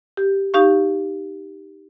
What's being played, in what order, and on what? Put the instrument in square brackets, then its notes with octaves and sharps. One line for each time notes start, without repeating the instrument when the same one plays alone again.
[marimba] G4
D#4 G4 F5 C#6